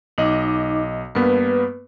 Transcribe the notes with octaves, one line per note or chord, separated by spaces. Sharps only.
B1 D#4 D#5 D6
G2 A#3 B3 B4